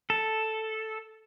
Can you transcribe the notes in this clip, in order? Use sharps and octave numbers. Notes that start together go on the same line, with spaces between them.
A4